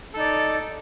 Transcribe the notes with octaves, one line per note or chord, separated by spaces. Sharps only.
D#4 A4 D5